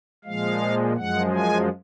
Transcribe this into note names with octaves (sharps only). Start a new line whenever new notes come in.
A#2 F3 G#3 F5
F#2 F3 G#3 F#5
G#5